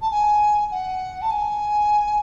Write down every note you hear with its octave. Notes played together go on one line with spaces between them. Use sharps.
A5
G#5
F#5
A5
G#5